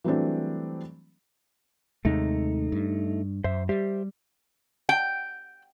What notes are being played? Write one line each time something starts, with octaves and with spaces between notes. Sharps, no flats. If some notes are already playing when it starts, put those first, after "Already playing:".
E3 F#3 G3 A3 C4 D4
D#2 C3 G#3 A3 D#4
G2
F#2 C5 E5
G3 G4 C5 E5
G5